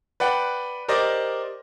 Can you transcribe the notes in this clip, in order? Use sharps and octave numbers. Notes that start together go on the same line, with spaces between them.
B4 D5 F#5 G5
G4 A#4 C5 D5 D#5